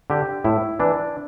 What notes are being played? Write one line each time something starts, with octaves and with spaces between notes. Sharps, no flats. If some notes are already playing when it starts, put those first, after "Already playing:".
D3 G4
A2 E4
E3 D4